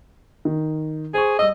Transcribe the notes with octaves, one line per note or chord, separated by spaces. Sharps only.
D#3
G#4 C5 C#6
G3 D#5 E6